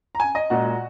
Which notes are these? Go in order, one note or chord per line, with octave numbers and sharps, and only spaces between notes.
A#5
G#5
D#5
A#2 G#3 F#4